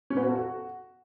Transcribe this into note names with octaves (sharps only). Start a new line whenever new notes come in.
C#4
B3
F#4
A4
F#4